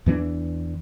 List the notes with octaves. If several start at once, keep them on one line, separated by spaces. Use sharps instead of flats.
E2 E3 G#3 D4